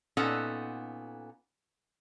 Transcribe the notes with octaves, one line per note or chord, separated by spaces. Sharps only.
A#2 B3 C#4 D#4 A4 F#5